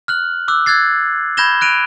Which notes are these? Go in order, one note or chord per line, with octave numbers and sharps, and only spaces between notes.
F6 F#6 F#7
D6 E6 F#6
E6 F#6 G#6 A6 C7
B5 G6 G#6 A#6 E7 G7
F#6 A#6 D7 D#7 F7